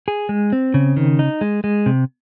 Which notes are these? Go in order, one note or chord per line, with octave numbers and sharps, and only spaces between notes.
G#4
G#3
C4
C#3
D#3
D#4
G#3
G#3
C3